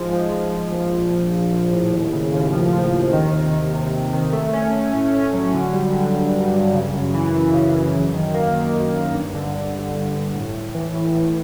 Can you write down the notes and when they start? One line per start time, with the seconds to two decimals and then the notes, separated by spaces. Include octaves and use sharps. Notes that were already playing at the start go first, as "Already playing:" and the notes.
Already playing: G#2 F3 G#3
0.13 F3
0.32 G#2
0.52 F3
0.72 A#1
0.92 A#1
1.12 A#1
1.32 A#1
1.53 A#1
1.73 A2
1.92 D#2
2.13 C#3
2.33 D#2
2.52 F3
2.72 F3
2.93 D#2
3.13 D#3
3.32 C3
3.53 D#3
3.73 C3
3.93 C3
4.13 D#3
4.33 A3
4.53 C#4
4.73 A3
4.93 A2
5.14 C#4
5.33 F#3
5.54 D3
5.73 G3
5.93 D3
6.14 G2
6.33 G2
6.54 G2
6.74 C#3
6.94 F#2
7.14 E3
7.34 F#2
7.54 C#3
7.74 F#2
7.94 F#2
8.14 D#3
8.34 A#3
8.54 D#3
8.75 F#2
8.94 F#2
9.14 G2
9.34 D3
9.55 D3
9.74 G2
9.95 G1
10.15 G2
10.35 A2
10.55 A2
10.75 E3
10.95 A2
11.15 A2